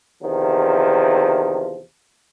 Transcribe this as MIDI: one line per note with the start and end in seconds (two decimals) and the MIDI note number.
0.22 1.80 40
0.22 1.80 48
0.22 1.80 51
0.22 1.80 53